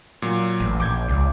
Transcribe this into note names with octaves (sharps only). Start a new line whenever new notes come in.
A#2 F#3
A1
A#1 D6 G6 G#6
C#2